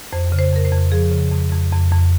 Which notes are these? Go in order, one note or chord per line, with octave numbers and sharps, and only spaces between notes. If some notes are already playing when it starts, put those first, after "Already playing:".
F2 C5
C#3
C5
F2 A#4
C5
F2
F3 G#4
C#3
F2
F2
F2
F2